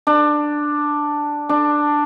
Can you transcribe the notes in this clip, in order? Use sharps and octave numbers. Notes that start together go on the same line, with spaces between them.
D4
D4